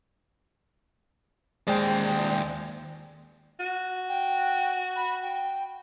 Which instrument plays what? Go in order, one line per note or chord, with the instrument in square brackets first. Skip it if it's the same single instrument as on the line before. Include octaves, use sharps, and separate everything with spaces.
[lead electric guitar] D#2 D5 [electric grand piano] G#3 C5 G5
[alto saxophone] F#4
[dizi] G5
B5
G5